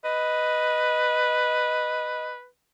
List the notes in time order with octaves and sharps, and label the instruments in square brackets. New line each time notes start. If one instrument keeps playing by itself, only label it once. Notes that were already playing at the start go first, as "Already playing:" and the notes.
[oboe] B4 [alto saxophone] D#5